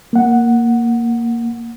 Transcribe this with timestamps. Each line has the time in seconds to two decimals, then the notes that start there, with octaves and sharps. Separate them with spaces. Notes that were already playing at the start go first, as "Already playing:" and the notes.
0.13 A#3 F#5